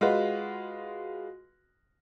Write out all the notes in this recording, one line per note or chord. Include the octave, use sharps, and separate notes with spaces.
G#3 F4 F#4 B4